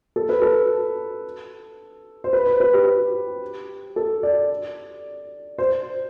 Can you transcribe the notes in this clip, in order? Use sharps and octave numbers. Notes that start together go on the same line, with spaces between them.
A4
B4
A4
C5
B4
C5
B4
G4
A4
D5
C5